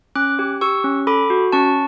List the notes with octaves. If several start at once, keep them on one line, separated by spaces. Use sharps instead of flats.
C#4 D6 F#6
G4
G4 C#6 E6
C#4
A4 B5 D6
F#4
C#4 A5 C#6